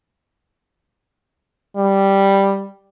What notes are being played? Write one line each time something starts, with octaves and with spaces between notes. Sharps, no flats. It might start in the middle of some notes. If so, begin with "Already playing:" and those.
G3